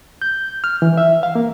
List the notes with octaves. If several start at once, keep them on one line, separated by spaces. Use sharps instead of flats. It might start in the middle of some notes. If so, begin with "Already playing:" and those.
G6
F6
E3
E5
F5
A#3